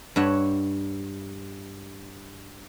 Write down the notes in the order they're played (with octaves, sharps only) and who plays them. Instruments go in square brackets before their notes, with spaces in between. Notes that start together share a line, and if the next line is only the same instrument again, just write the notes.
[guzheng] G2 C#5 E5 F#5